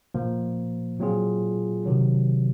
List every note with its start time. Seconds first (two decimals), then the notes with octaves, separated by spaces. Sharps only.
0.15 A#2 F3 A#3
1.00 A#2 F#3 C4 F4 G#4
1.86 C3 D#3 F#3